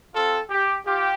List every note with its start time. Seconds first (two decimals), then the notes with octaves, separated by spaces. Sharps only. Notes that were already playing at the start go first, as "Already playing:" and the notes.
0.14 C4 F4 A4
0.50 G4
0.86 F4 G4